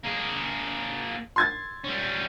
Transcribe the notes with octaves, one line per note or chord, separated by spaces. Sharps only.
A#3 G#4
C6 G#6 A6
G3 C#4